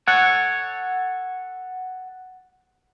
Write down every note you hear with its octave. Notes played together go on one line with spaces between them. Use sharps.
A4 C#5 F#5